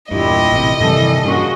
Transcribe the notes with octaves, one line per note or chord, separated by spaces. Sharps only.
E2 G2 A#2 E4 G4 D#5
A1 C3
G2 C3 D#3 E3 G3 A4
G2 A#2 C#3 F#4